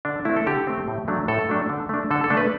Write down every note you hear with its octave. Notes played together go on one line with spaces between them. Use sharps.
D3 D4
A3 C4 E4
A4
D3 G4
A3 C4
A2
F#3 A3 D4
A2 A4
F#3 A3 D4
D3
A3 D4
D3 A4
A4
A3 D4
B4